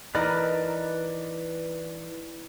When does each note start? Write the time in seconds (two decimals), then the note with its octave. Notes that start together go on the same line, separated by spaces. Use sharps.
0.15 E3 D#4 A#4 B4 D5 D#5 A5 B5